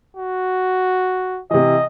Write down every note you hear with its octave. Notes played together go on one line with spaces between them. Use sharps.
F#4
C3 E3 D#5